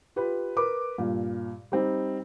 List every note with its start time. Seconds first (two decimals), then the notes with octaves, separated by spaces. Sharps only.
0.16 F4 G4 B4
0.56 A#4 B4 D6
0.98 G2 A#2
1.72 G3 C4 D#4